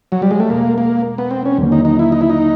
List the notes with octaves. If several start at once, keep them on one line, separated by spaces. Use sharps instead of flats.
F#3
G3
G#3
A3
E2 B2 G#3 A#3
A#3
B3
C4
C#4
D#2 D3 F#3 A#3
D#4
D#4
E4
D#4
E4
D#4